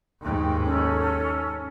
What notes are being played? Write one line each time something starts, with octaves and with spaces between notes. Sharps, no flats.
D#2 G#2 G5
C#4 A4